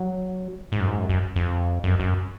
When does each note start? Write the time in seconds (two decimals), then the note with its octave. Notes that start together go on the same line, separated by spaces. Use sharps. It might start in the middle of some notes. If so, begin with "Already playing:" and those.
Already playing: F#3
0.72 G#2
0.80 F#2
0.87 G#2
0.99 F#2
1.09 F#2
1.36 F2
1.84 F#2
2.00 F#2